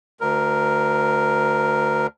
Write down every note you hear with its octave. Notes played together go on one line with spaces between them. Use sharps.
D2 A#4